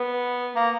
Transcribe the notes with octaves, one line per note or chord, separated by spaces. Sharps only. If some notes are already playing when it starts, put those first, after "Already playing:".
Already playing: B3
A#3